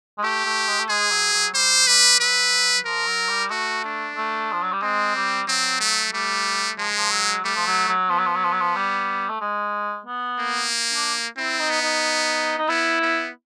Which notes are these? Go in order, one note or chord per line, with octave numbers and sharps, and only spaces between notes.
G#3
A3 G4
A3
G#3
A3
G#3 G#4
F#3
F#3
G3 C5
G3 B4
F#3 B4
F3 A#4
F#3
G3
A3 F#4
D4
A3
F3
F#3
G3
G#3 C4
G3
F#3 C4
A3
G3 A3
F3 G#3
F3
F#3
G3 A3
F3
F#3
F#3
F3 B3
F#3
F3
F#3
F3
F#3
F3
G3
A3
G#3
B3
A#3
D4
C4 E4
D#4
B3
D#4
D#4
B3 E4
B3